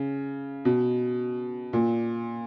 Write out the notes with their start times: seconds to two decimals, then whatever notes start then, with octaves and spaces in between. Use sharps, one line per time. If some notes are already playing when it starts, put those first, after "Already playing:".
Already playing: C#3
0.65 B2
1.73 A#2